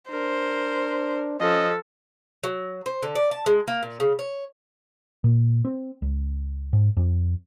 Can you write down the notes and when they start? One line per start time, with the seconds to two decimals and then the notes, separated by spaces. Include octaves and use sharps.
0.11 D4 A#4 C5
1.41 F3 C#4 A4 D#5
2.43 F#3
2.86 C5
3.03 D3
3.15 D5
3.31 A5
3.46 G#3
3.68 A#3
3.83 A#2
4.00 C#3
4.19 C#5
5.24 A#2
5.65 C4
6.02 C#2
6.73 G#2
6.97 F2